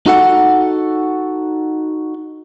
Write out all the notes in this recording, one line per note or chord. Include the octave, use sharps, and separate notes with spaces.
D#4 F#4 A4 F#5